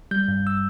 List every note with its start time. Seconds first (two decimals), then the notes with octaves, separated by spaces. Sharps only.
0.11 G3 G6
0.28 G2
0.47 E6